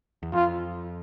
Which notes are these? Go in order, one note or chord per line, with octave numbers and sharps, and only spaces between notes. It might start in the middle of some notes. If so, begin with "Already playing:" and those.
E2
F2 F4